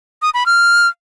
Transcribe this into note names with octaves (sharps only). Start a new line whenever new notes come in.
D#6
B5
F6